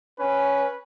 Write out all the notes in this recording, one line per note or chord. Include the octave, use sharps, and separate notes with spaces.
C#4 B4